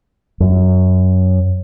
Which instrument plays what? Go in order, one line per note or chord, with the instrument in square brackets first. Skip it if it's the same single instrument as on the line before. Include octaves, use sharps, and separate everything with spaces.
[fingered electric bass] F#2